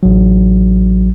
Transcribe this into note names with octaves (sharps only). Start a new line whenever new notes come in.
A1 F#3